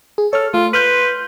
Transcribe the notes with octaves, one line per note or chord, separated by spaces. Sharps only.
G#4
A4 C#5 F6
A3 F4
B4 C6 F6 G6